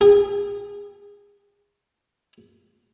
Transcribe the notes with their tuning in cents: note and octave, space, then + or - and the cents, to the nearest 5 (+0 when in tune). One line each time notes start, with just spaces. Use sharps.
G#4 -30